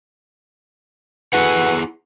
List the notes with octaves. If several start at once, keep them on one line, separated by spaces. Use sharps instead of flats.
E4 F#4 G#4 A4 B4 F#5